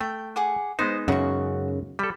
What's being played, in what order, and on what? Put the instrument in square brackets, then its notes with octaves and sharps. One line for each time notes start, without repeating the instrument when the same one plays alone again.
[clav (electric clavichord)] A3 [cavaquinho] G5
[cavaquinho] G#4 F#5 D6
[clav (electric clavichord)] G#3 B3 D#4 [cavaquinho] C5
[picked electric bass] F#2 C#3 [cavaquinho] F#4 C#6
[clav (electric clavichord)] G3 A4 [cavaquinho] B5